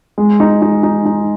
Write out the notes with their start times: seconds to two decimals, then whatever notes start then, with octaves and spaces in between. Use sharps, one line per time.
0.18 G#3
0.40 D#4
0.62 D#4
0.83 D#4
1.06 D#4